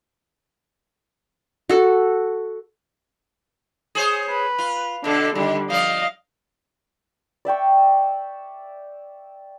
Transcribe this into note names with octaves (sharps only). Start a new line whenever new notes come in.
F#4 A4
G#4 C5 C#5
B4
F4
B2 D3 D4 A4
D3 D#3 G3
F3 D5 D#5 F5
D5 E5 G5 C#6